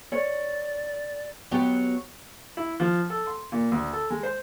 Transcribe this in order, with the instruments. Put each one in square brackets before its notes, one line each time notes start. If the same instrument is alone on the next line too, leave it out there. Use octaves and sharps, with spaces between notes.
[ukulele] C#5 [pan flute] D5
[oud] F#3 B3 G4
[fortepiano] E4
F3
A4
C6
A#2
D2
A4
G#3
C5